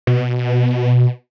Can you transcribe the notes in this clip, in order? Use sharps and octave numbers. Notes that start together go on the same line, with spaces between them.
B2